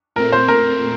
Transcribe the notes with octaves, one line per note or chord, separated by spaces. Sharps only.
A#2 A3 C4 A#4
C5
A#4